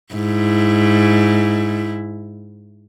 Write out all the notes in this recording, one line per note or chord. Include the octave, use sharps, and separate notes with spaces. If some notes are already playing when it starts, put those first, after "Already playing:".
G#2 E4